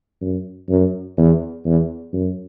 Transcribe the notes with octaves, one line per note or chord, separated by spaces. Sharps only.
F#2
F#2
E2
E2
F#2